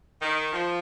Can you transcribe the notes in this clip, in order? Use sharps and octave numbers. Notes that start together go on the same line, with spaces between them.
D#3
F3